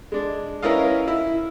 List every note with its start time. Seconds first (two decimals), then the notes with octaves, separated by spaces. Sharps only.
0.12 G#3 D4
0.63 C#4 E4 A#4 B4 D#5 F5
1.08 E4